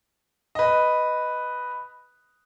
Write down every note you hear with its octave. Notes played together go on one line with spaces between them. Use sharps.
B4 D#5